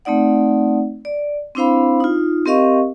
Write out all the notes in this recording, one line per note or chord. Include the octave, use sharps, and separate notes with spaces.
A3 C4 D#4 D5 F#5
D5
C4 D4 E4 C5 F5 B5
D#4 F4
C4 G4 A#4 D#5 F5 C#6